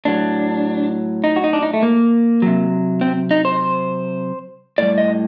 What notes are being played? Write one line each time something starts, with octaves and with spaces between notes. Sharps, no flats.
A2 F#3 D4
D#4
F#4
D#4
D4
D#4
A3
A#3
C3 F#3
C4
D#4
C5
A2 G3 D5
D#5